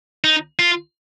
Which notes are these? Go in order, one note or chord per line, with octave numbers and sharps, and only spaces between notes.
D#4
F4